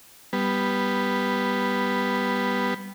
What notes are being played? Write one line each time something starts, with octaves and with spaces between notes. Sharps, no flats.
G3 B3